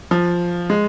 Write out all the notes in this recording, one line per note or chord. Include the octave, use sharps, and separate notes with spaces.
F3
G#3